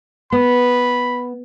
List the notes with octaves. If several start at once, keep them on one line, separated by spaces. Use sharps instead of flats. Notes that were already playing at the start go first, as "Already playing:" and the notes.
B3 B5